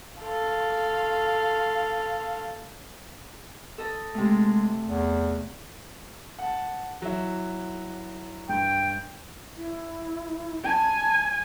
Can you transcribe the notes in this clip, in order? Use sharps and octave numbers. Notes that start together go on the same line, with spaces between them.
A4 F5
A4 D#5
C3 G#3 A3
E2
F#5 A5
F#3 E4
G2 G5
E4
G#5 A5